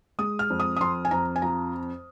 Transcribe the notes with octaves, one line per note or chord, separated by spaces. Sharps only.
G#3 D#6
F6
F2
D#6
D#6
F2 C6
G#5
F2 A#5
G#5
F3 A#5